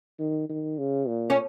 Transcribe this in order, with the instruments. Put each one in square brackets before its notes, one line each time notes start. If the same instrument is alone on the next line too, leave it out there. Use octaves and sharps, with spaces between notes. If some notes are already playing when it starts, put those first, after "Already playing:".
[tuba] D#3
D#3
C#3
A#2
[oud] C#4